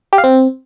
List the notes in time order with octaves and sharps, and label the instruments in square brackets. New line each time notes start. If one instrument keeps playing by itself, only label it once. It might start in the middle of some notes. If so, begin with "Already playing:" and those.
[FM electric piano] G4
F5
C4